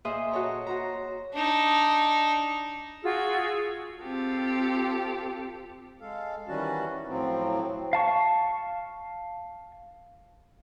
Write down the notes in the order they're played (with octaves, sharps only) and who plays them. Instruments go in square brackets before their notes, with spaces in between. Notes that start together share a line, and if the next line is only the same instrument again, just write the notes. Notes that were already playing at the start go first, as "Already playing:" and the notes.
[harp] A#2 G#4 C5 D#5 E5 D#6
F#4 A4 C#5 D#5 A#5
F#4 C5 A#5
[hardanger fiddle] D4 D#4
[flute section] F4 F#4 G#4 E6
[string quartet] C4 F4 G4 A4
[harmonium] G#3 A4 F5
D#3 E3 G3 C#4 F#4 A5
A2 F3 F#3 C4
[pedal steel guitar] F5 A5 C#6